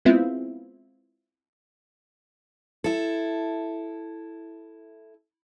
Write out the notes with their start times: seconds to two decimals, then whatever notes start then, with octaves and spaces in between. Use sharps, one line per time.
0.05 G#3 B3 C4 E4 F4
2.84 E4 A4